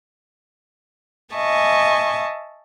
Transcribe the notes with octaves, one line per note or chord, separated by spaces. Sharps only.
D#5 E5 G#5 A5 C#6